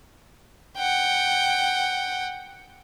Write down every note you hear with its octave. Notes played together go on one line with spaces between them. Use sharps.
F#5 G5